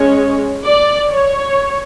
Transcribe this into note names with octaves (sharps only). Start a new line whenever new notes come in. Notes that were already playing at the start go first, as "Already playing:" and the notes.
Already playing: G#3 C#4 C#5
D5
C#5